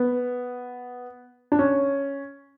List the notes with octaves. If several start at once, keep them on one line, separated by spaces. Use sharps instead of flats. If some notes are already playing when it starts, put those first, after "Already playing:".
Already playing: B3
D4
C#4